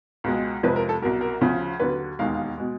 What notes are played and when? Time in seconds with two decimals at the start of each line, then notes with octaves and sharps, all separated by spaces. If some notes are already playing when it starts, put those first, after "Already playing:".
0.24 C#2 B2 G#3
0.63 F2 C3 F3 G#3 B4
0.76 A#4
0.89 A4
1.02 C2 B2 F#3 A#4
1.21 A#4
1.41 D2 C#3 F3
1.80 D#2 D3 F#3 B4
2.19 E1 D#2 D#3 G#3 F5
2.34 F5
2.58 B2 G#3